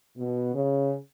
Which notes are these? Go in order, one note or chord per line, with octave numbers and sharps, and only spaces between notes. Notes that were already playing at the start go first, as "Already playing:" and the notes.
B2
C#3